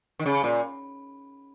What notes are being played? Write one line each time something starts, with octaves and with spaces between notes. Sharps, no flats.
D#3
C#3
A#2